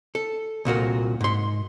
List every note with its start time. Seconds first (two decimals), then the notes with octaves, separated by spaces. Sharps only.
0.15 A4
0.65 C2 A#2 F#4 A#4
1.21 G#2 C6